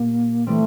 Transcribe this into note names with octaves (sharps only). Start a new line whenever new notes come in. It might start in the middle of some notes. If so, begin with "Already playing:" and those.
Already playing: A#2 A#3 G4
E3 G3 A3 C4